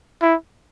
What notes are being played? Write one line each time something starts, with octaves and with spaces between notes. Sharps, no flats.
E4